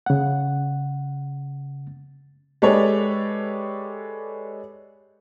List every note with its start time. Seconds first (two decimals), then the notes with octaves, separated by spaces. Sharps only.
0.06 C#3 F#5
2.62 G#3 G4 A4 B4 C#5 D5